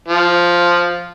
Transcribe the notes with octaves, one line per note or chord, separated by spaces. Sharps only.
F3